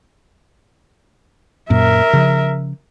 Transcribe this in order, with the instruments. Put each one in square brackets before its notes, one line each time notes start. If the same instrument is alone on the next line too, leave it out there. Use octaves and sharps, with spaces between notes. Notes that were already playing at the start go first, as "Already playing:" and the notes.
[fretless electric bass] F#2 A#2 [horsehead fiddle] A#4 E5
[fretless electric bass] C#3 F3